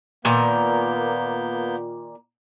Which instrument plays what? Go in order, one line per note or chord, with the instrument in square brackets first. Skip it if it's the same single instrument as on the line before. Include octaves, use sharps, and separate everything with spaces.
[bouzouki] A#2 D#3 A#4 [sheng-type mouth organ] A#3 B3 G6